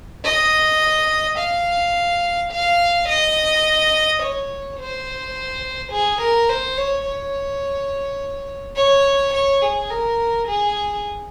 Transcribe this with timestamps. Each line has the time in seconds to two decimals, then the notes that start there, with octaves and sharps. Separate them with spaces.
0.25 D#5
1.38 F5
2.52 F5
3.09 D#5
4.22 C#5
4.79 C5
5.92 G#4
6.21 A#4
6.49 C5
6.78 C#5
7.06 C#5
8.77 C#5
9.34 C#5
9.62 G#4
9.90 A#4
10.47 G#4